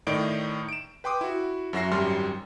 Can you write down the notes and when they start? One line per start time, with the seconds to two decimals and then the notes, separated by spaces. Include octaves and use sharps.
0.07 A2 D#3 D#4 D5 D7
0.69 D7 E7
1.04 B4 G5 C6 D6 D#6
1.21 E4 F#4
1.73 F#2 F#3 F#4 E5 A#6 C7
1.91 G#1 F#2 G3 C6 F6